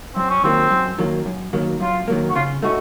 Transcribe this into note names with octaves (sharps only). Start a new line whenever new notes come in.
F#2 C4
C#4
D#3 F#3 A#3 C4
F#2
D#3 F#3 A#3
F#2
D#3 F#3 A#3
F#2 F4
D#3 F#3 A#3
F#4
C#3 F4
A3 C#4 D#4 F#4